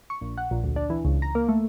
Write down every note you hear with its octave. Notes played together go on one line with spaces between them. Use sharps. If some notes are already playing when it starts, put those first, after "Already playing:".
C#6
A#1
F#5
A#1
D2
D4
E3
C#2
A#5
A#3
A3